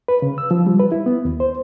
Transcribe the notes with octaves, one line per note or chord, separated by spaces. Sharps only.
B4
C#3
E6
F3
G3
B4
E4
B3
D#2
C5